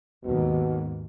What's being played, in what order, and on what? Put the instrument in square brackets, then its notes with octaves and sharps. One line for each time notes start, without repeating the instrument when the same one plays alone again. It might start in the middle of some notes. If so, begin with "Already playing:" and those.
[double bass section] D#2 G#2 [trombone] B2